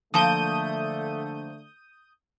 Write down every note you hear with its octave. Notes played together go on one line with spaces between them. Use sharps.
D3 F3 A3 A#3 A5 D#6 G6 D#7